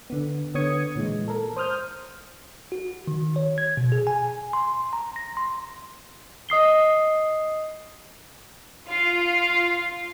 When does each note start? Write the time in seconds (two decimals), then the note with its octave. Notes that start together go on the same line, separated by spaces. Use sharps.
0.10 D3 B3
0.54 D3 B3 C#5 D#6 G#6 C#7
0.96 A#2 E3 G#3
1.28 A4 A#4
1.56 C5 D#6 F6 G6
2.72 F#4
3.07 D#3
3.36 C#5
3.58 G#6
3.77 B2
3.92 G#4
4.07 G#5
4.53 C6
4.93 A#5
5.16 A#6
5.37 C6
6.49 D#5 D#6 C7 G7
8.86 F4 F5